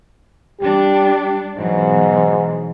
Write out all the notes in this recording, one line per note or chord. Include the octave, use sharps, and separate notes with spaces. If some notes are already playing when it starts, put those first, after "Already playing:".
G3 D4 G4
G#2 B2 E3 F#3